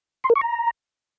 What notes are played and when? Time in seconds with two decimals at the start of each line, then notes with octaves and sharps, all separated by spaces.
0.24 C6
0.30 A#4
0.36 C#6
0.41 A#5